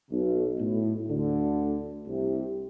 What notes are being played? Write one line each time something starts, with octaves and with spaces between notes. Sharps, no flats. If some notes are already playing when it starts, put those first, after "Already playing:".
B1 B2
A2
D2 D3
C2 C3